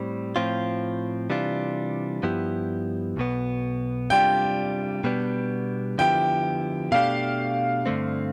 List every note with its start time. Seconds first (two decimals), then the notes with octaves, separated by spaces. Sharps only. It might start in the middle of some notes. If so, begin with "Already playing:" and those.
Already playing: A2 G3 C4
0.36 A2 F3 C4 F4
1.30 C3 E3 G3 D4 F4
2.23 G2 F3 B3 E4 G4
3.17 B1 B2 B3
4.10 C3 G3 D4 F4 G5
5.04 B2 G3 B3 D4
5.98 D3 F3 B3 E4 G4 G5
6.92 B2 A3 D4 G4 F5
7.86 G2 D3 A3 C4